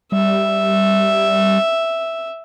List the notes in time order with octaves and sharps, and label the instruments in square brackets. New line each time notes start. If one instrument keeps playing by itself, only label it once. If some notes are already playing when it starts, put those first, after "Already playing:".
[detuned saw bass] G3 [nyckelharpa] E5